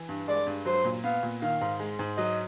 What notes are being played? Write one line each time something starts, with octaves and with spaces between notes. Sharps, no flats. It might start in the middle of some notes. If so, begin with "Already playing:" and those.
Already playing: E3
G2
G#3 D5
G2
F#3 C5
A#2
B3 F5
A#2
D#3 F5
G#2
G#3
G#2
F#3 D#5